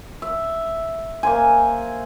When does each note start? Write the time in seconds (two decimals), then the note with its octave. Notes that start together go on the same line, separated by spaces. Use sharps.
0.22 E5
1.23 A#3 C5 G#5